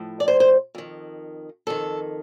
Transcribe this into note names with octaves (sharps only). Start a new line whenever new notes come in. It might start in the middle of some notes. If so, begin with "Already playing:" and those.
Already playing: A2 F3
D5
C5
C5
F2 D#3
F2 D#3 A4